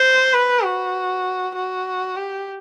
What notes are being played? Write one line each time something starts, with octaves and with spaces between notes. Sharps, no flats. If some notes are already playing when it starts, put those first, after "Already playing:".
Already playing: C5
B4
F#4
F#4
G4